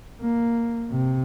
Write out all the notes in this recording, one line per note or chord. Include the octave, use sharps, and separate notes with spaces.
A#3
C3